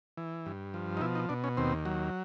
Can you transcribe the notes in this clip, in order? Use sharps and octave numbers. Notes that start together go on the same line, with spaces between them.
E3
G2
F3
D#4
B2 E4
D#4
B2 D4
C#4
D#2 C4
F#3